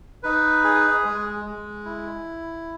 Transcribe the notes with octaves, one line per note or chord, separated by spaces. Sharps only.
D#4 B4
G#4
G#3
G#3
E4